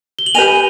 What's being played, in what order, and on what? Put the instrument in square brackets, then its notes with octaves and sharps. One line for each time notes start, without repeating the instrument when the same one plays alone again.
[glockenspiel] G7
F#7
[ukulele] G4 B4 D#5 G#5 [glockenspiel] D#7 F7